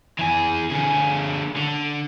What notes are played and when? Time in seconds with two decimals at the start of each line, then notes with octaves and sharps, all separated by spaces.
0.19 E3 G#4
0.70 D3 G#4
1.56 D3